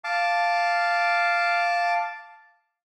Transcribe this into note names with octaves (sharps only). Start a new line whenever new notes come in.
F5 A5 D6